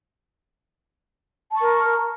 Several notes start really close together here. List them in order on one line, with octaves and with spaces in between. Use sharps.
A5 C#6 A#4